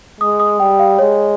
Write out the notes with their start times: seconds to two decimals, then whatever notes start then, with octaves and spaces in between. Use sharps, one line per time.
0.21 G#3 D#6
0.40 D#6
0.60 G3 G5
0.79 F5
0.99 G#3 C#5